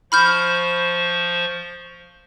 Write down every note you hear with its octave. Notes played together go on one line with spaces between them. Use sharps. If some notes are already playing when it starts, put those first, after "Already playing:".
F3 C5 B5 C#6 F6 G6